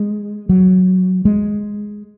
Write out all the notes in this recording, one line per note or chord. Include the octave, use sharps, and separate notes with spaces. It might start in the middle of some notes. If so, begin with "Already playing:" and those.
Already playing: G#3
F#3
G#3